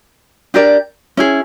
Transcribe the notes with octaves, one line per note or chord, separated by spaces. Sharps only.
D4 G4 A#4 D5
C#4 E4 G#4